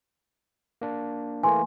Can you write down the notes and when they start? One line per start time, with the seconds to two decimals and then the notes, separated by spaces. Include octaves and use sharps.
0.82 A#3 D4
1.43 E3 A3 A#3 G#5 C6